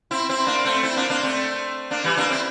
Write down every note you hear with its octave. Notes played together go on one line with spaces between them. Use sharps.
C4 E4
C4 E4
A#3 D4
A3 C4
C4 E4
A#3 D4
A#3 D4
A3 C4
A#3 D4
E3 G3
A#3 D4
C4 E4